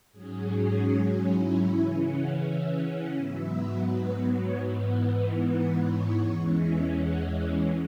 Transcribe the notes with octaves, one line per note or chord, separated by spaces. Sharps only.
G#2 F#3 C#4 G#4
E4
C#3 E3 C#4
F#5
E5
F#5
G#2 F#3 B3 E5
B4
C#5
G#2 E3 B3
F#5
C#5
E2 E3 G#3 C#4
E5
F#5